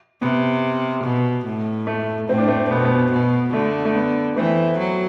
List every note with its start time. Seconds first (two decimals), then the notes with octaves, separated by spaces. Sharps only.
0.21 C3 B3
1.04 B2
1.46 A2
1.87 A3
2.29 A2 C4
2.38 D4
2.48 A3 C4
2.70 B2 B3
2.77 A3
2.85 B3
3.12 B2
3.53 D3 A3
3.85 A3
3.95 B3
4.36 E3 A3 C4
4.78 F#3